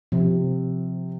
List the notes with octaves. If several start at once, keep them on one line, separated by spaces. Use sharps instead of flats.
C3 F3